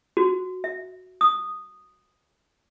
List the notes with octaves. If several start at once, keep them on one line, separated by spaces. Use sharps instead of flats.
F#4
E5
D#6